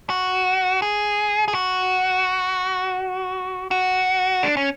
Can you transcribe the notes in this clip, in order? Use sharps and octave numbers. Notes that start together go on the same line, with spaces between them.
F#4
G#4
G#4
F#4
F#4
D4
C#4